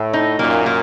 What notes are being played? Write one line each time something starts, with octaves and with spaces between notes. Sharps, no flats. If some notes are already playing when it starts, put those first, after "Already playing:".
Already playing: A2
D#4
F#2 A#2 A#3
A#3